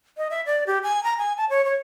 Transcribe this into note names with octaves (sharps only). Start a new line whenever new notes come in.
D#5
E5
D5
G4
G#5
A#5
G#5
A5
C#5
C#5